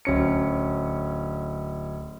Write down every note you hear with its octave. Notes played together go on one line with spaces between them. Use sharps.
D1 C#4 C#7